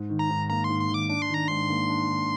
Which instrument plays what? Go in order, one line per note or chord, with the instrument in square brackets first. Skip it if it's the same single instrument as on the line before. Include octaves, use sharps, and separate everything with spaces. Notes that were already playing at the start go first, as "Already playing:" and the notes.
Already playing: [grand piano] G#2
D#3
[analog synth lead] A#5
[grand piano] G#2
[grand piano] A#3 [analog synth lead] A#5
[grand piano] G#2 [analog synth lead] C6
[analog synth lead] C6
[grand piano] D#3 [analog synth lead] D6
[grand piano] D4 [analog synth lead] D6
[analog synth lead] C6
[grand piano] D#3 [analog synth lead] A#5
[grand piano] G#2 [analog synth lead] C6
[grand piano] A#3
D4
D#3